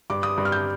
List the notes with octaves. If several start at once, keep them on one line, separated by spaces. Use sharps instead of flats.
G2 D6
D#6
G2
F6
G6